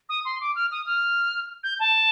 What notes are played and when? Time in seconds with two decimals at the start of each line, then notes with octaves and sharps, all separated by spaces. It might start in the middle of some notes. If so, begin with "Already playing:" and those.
0.09 D#6
0.25 C6
0.41 D6
0.56 F6
0.72 D#6
0.86 F6
1.63 G6
1.80 A5